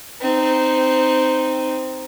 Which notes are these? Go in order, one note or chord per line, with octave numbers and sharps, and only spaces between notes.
C4 D#4